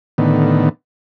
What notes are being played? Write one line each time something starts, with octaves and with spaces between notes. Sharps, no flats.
A2 D3 D#3 B3